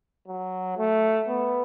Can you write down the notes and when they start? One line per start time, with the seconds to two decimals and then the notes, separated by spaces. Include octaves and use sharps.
0.28 F#3
0.78 A3
1.28 B3